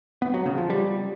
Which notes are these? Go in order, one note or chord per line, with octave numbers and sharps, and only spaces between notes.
B3
F#3
C#3
F3
G3